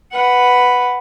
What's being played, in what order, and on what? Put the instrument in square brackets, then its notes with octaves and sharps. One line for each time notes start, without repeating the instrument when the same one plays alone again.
[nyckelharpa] B4 F#5